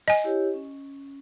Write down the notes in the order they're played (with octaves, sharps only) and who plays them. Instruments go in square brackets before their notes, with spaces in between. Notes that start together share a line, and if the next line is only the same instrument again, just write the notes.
[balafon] D#5 G#5
[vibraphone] E4 G4 C#5
C#4